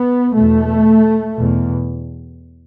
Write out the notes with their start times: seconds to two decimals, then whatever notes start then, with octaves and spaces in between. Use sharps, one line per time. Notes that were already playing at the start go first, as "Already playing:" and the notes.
Already playing: B3
0.34 E2 B2 A3
1.35 E2 B2